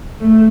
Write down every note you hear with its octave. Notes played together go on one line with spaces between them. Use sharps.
A3